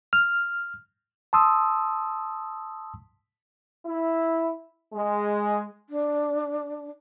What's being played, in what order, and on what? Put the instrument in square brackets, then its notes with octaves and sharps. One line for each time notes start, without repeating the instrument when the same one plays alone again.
[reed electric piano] F6
[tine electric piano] A5 C6 D#6 E6
[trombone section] E4
G#3
[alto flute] D4